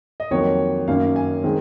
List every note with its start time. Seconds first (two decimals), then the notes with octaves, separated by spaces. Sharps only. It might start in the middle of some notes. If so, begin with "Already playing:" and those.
0.20 D#5
0.31 F2 D#3 F#3 A#3 C#5
0.88 F#2 D#3 A#3 C#4 F5
1.16 G#5
1.44 D#3 G#3 C4